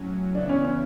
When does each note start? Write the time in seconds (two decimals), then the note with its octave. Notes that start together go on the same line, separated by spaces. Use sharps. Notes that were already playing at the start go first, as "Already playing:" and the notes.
Already playing: A2 F#3 C#4
0.35 C#3 E3 B3 D4 E4
0.49 C#4
0.64 C#4